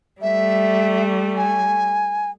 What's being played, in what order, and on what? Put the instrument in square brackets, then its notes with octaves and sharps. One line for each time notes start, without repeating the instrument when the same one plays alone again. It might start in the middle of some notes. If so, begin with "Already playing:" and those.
[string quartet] G3 A3 [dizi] E5
[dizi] G#5